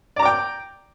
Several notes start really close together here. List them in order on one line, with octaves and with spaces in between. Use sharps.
D5 A#5 D6 G5